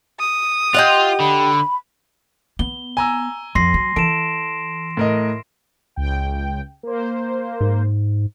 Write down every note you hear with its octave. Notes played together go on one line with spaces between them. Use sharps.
D#6
F4 G4 D#5 F#5
D3 B5
B3 G7
G#5 A#5 E6
F2 C6 A#6 C7
F#3
E3 A4 D7 E7
A2 A#4 D#5
C#2 G5
A#3 C5
G#2